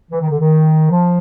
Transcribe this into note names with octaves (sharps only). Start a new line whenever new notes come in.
E3
D#3
D3
D#3
F3